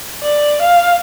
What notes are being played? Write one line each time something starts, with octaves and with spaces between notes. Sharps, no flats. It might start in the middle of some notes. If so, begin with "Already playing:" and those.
D5
F5